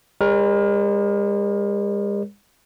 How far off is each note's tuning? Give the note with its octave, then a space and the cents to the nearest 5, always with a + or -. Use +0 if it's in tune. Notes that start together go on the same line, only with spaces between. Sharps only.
G#3 -45 A#4 +20 C#5 +0